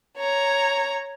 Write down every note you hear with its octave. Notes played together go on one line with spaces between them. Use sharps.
C#5 A#5